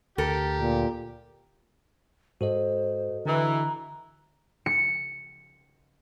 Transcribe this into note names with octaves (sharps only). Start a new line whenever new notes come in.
D2 G4 A4 A#4
A#2
G#2 F#4 A4 C5 D#5
D3 E3 A#5
C#7